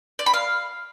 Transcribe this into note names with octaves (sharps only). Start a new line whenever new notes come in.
D5
B5
F5